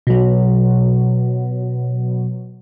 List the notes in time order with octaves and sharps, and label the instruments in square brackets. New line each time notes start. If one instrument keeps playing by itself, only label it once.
[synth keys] B2 F#3